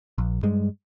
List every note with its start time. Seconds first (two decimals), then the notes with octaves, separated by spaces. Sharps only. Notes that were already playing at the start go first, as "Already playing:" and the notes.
0.18 A#1
0.43 G2 G3 G#3